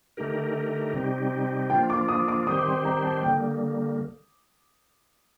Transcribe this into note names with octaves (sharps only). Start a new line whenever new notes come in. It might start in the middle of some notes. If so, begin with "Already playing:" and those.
D3 A3 D#4 G4 A#4
C3 G3 C4 D#4 G4
F3 A#3 D4 F4 G5
D6
D#6
D6
D#3 G3 C4 G4 C5 D#6
D6
C6
A#5
A5
D3 G3 A#3 G5